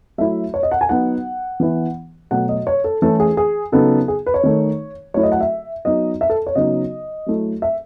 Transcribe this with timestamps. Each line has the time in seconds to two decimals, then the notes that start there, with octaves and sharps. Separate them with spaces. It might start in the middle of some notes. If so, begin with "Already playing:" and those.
0.18 F#3 A3 E4 E5
0.54 C#5
0.63 D#5
0.71 F#5
0.81 G#5
0.89 F#3 B3 D#4 F#5
1.60 E3 B3 E4
2.31 B2 F#3 A3 F#5
2.49 D#5
2.67 C#5
2.84 A4
3.02 E3 A3 C#4 E4 A4
3.20 G#4
3.37 G#4
3.72 C#3 F#3 B3 D#4 A4
4.08 G#4
4.26 B4
4.34 C#5
4.43 D#3 A3 D#4
5.14 F#3 A3 E4 C#5
5.23 D#5
5.32 F#5
5.41 E5
5.85 F#3 B3 D#4 D#5
6.21 E5
6.30 A4
6.47 C#5
6.55 C#3 F#3 B3 D#4 D#5
7.26 F#3 A3 E4
7.62 E5